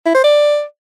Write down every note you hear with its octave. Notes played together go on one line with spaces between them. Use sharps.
E4
C5
D5